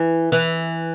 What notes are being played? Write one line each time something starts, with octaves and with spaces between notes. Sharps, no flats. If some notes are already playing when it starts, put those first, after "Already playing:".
Already playing: E3
E3